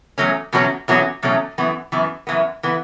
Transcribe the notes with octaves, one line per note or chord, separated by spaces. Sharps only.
E2 B2 F#3 A3 C#4
E2 B2 F#3 A3 C#4
E2 B2 F#3 A3 C#4
E2 B2 F#3 A3 C#4
F#2 E3 B3
F#2 E3 B3
F#2 E3 B3
E3 B3